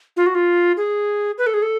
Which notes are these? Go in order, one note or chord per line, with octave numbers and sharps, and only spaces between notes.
F4
F#4
F4
G#4
B4
A4
G#4
A4